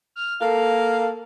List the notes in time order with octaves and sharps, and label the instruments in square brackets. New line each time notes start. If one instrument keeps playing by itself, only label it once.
[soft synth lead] F6
[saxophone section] A#3 F5 [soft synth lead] A4